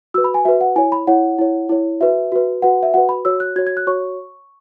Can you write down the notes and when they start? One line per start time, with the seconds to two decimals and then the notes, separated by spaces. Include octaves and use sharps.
0.14 F#4 E6
0.18 B4
0.24 B5
0.34 G#5
0.45 F#4 B4 E5
0.61 F#5
0.76 E4 C#5 G#5
0.92 B5
1.07 E4 C#5 F#5
1.38 E4 C#5
1.69 E4 C#5
2.01 F#4 B4 E5
2.32 F#4 B4
2.62 F#4 B4 F#5
2.83 E5
2.94 F#4 B4 F#5
3.09 B5
3.25 F#4 C#5 E6
3.40 F#6
3.56 F#4 C#5 G#6
3.67 G#6
3.77 F#6
3.87 F#4 C#5 C#6